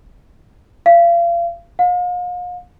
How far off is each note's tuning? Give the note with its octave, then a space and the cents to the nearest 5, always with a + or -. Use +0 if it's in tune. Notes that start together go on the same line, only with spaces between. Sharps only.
F5 -35
F5 +40